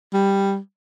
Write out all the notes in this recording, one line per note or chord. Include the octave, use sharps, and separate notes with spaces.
G3